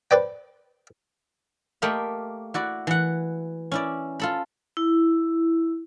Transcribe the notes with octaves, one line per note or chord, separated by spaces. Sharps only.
B4 C5 D5 G5
A3 A#3 G4 A#4 D#5 B5
E4 F#4 D5
E3 F#5
C#4 E4 D5
F4 A4 B5
E4